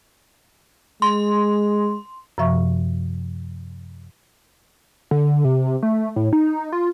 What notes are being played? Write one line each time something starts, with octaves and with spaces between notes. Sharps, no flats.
G#3 C6
F#2 C3 F3 E5 C#6
D3
C3
A3
A2
D#4
F4